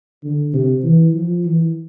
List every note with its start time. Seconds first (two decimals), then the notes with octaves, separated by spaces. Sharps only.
0.24 D3
0.53 C3
0.83 E3
1.14 F3
1.45 E3